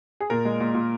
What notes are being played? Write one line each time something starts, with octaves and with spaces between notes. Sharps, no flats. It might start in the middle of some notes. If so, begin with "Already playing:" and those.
G#4
A#2 A#4
G#3
A#2
A#2